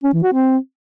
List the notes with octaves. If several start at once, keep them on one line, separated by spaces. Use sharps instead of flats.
C#4
E3
F#4
C4